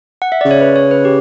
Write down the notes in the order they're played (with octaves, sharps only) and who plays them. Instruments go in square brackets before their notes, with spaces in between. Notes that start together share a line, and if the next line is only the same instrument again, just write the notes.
[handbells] F#5
E5
[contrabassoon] C#3 [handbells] D5
[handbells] C#5
B4
C#5
B4
G4